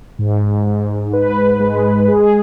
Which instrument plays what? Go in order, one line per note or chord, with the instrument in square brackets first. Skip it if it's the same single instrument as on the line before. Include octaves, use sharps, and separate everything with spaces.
[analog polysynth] G#2
G#2
B4
G#3
G#4